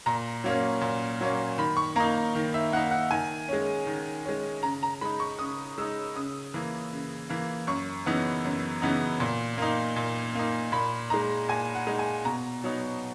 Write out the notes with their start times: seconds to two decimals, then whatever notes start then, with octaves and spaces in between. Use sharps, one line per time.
0.06 A#2 A#5
0.44 F#3 A#3 C#4
0.81 A#2
1.21 F#3 A#3 C#4
1.58 D#3 B5
1.77 C#6
1.96 A#3 D#4 A#5
2.35 D#3
2.54 E5
2.73 A#3 D#4 F#5
2.91 F#5
3.11 D#3 G#5
3.48 G#3 C#4
3.87 D#3
4.25 G#3 C#4
4.63 C#3 A#5
4.83 A#5
5.01 G#3 D#4 B5
5.20 C#6
5.39 C#3 D#6
5.78 G#3 D#4 E6
6.16 C#3 D#6
6.54 E3 A#3
6.92 C#3
7.29 E3 A#3
7.67 F#2 C#6
8.06 C#3 E3 B3 D#4
8.44 F#2
8.82 C#3 E3 B3 D#4
9.20 A#2
9.58 A#3 D#4
9.96 A#2
10.35 A#3 D#4
10.72 A#2 B5
11.10 G#3 D#4 A#5
11.49 A#2 G#5
11.75 F#5
11.87 G#3 D#4
11.99 G#5
12.25 B2 A#5
12.64 F#3 B3 D#4